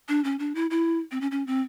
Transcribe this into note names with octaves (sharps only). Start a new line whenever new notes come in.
D4
C#4
D4
E4
E4
C4
C#4
C#4
C4